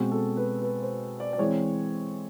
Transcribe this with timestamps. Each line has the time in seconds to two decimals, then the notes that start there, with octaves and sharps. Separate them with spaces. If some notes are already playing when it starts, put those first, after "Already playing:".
Already playing: B2 G#3 C4 F#4
0.12 A4
0.37 B4
0.62 B4
0.81 C5
1.20 D5
1.33 D5
1.38 E3 G#3 C4 C#5